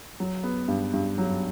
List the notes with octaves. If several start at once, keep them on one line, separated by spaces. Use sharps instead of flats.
F#3
B3
G2
G2
F#3